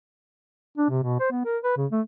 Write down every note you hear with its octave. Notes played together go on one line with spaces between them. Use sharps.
D4
C3
B2
C5
B3
A#4
B4
C#3
A3